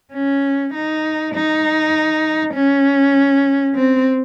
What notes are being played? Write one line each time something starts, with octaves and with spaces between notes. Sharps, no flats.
C#4
D#4
D#4
C#4
C4